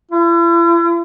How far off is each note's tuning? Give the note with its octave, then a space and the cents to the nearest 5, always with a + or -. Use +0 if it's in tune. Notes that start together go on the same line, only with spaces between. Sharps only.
E4 +45